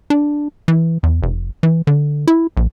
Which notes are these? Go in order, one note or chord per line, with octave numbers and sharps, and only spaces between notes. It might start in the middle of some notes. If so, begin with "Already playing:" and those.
D4
E3
E2
F1
E3
D3
E4
A#1